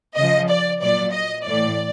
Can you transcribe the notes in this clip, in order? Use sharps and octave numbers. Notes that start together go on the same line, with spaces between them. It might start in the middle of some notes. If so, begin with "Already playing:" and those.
C#3 F3 D#5
D5
A#2 F#3 D5
D#5
A2 E3 D5